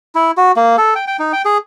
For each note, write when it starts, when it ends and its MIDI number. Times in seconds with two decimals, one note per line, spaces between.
0.15 0.31 64
0.37 0.52 66
0.56 0.76 58
0.78 0.94 69
0.95 1.05 79
1.07 1.17 79
1.19 1.32 63
1.33 1.42 79
1.45 1.58 68